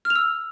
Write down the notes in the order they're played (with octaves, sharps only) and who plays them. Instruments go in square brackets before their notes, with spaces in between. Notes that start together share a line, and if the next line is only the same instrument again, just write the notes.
[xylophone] F6
F7
E6